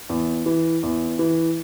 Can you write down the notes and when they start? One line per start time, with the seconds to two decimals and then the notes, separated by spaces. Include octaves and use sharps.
0.10 E2
0.46 E3
0.83 E2
1.19 E3